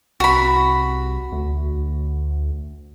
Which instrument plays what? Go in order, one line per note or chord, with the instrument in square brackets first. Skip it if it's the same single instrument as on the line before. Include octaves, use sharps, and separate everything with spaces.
[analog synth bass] C2 [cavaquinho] F#4 B5
[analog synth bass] D2